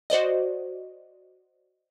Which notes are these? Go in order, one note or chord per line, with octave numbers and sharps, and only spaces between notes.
F#4 C5 D5 D#5